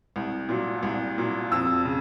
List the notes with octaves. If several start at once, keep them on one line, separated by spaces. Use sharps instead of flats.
C2
A#2 F#3
C2
A#2 F#3
F2 E6
C#3